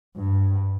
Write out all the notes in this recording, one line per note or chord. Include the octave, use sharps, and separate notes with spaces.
G2